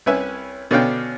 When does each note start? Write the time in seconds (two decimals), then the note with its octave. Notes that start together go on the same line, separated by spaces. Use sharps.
0.06 C2 C#4 B4 E5 G#5
0.71 B2 D3 C#4 D4 F5 G5